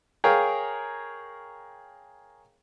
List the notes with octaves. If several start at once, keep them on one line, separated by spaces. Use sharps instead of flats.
G#4 A#4 C#5 F5 G5